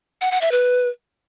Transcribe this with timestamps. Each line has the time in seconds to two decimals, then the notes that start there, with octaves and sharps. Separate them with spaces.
0.21 F#5
0.31 F#5
0.41 E5
0.51 B4